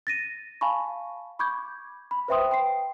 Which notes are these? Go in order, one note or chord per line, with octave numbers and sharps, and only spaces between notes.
A6 A#6 D#7
F5 G#5 A5 B5 C#6
B5 C#6 D6 G6 G#6
B5
B4 C5 E5 G5 C6 D#6
G5 C7